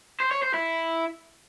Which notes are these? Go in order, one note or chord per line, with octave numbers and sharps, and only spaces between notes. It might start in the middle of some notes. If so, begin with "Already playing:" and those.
C5
C#5
C5
E4